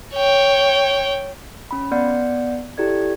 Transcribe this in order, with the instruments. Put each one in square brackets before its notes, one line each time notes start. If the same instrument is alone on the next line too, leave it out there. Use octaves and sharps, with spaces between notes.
[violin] C#5 G5
[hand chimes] C#4 B5
B3 D5 F#5 G6 C#7
E4 G4 A4 D5 G#6